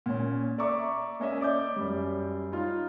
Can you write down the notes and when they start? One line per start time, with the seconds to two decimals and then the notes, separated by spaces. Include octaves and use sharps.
0.06 A#2 C#4
0.58 D5 E5 A#5 C#6 D6
1.20 A#3 C#4 D#5 E5
1.41 D5 D6 G6
1.76 F#2 G3
2.52 D#4 F4